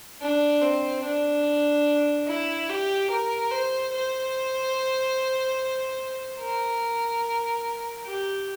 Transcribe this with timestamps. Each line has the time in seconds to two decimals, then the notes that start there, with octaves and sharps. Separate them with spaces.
0.21 D4
0.62 C4
1.04 D4
2.27 E4
2.69 G4
3.10 A#4
3.51 C5
3.93 C5
6.40 A#4
8.06 G4